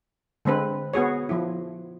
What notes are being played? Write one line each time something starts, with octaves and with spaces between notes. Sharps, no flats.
D3 G#3 C4 B4
B3 F#4 G#4 C#5
F3 E4